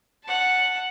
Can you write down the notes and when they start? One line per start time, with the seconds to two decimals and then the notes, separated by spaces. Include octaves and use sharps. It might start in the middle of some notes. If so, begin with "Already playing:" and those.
0.24 F#5 A5